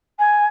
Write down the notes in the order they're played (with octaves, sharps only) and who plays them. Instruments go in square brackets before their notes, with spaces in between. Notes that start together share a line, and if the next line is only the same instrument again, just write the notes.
[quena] G#5